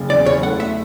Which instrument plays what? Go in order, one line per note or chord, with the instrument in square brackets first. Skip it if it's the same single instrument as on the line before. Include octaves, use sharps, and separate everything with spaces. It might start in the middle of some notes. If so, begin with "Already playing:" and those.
Already playing: [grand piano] F#1 C#3
[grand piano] E2 [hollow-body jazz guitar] D5
[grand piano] F#1 [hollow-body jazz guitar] C#5
[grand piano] A3 [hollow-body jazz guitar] F#5
[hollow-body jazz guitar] E5